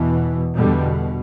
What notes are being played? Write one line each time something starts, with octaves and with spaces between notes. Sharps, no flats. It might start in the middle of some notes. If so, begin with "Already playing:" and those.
Already playing: E2 B2 E3
E2 B2 D3 G3